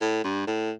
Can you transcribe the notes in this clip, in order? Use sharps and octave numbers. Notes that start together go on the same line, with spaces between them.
A2
G2
A2